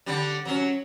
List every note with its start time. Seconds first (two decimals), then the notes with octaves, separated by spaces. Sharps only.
0.06 D3 G3 D4
0.45 F#3 C#4